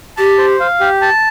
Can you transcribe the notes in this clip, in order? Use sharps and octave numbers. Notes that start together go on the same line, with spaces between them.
G4 A5
C5
F5
G4
A5